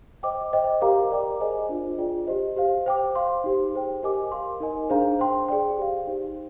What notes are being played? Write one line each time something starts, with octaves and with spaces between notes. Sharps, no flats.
C5 D#5 G5 D6
C5 D#5 G5
G4 A#4 F5 A#5 D6
A#4 D5 G5 A#5 D6
G#4 C5 D#5 G#5
D4 F4 C5
F4 G#4 D5 G5
G4 C5 D#5
G4 C5 F5
C5 G5 D6
C5 F5 C6
D#4 G4 C5
G#4 C5 G5
G4 A#4 D#5 G#5 D6
A#4 F5 C6
D#4 A#4 D#5 G#5
D4 G#4 C5 F5 A#5
C5 G5 C6
G#4 D5 G5
G4 C5 F5
D#4 G4 C5